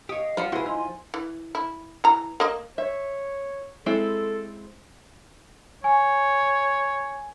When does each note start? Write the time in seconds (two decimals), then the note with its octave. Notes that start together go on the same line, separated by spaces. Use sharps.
0.09 G4 C#5 D#5 F5 D#6
0.37 F3 G3 F#5 C6 C#7
0.52 E4 F#4 G#4 B4 B5 C6
0.66 D#4 E4 G#5 C6
1.14 E3
1.55 E4
2.04 E3 A#5
2.40 A#3 D#5
2.78 C#5 E5
3.86 G#3 C4 E4 A4
5.84 C#5 G#5